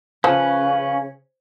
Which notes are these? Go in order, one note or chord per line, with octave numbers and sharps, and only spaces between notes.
C#3 F3 C#4 B4